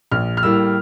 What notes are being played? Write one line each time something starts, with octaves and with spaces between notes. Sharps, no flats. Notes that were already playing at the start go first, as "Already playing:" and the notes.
A#1 F6
F6
A2 G3 A#3 E6